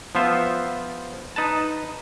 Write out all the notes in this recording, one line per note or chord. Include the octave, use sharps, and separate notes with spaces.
F3 B3 F4 C5 E5
D#4 B4 A5